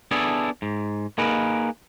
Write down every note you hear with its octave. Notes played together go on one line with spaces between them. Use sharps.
B3 D4 E4 G#4 A4
G#2
A#3 D#4 G#4 A#4 B4